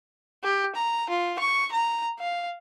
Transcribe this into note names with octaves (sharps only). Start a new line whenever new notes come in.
G4
A#5
F4
C#6
A#5
F5